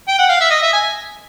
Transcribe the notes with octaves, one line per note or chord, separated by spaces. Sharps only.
G5
F#5
F5
E5
D#5
E5
G#5